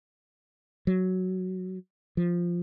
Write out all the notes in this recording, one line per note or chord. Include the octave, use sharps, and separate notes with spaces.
F#3
F3